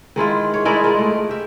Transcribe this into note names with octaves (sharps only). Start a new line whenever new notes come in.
D#3 G#3 E4 F4
C#5
G#3 E4 A#4 D5
G#3 F4 A#4
A3
G4 E5